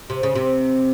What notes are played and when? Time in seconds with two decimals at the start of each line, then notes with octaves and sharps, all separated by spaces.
0.10 C3
0.23 C#3
0.35 C3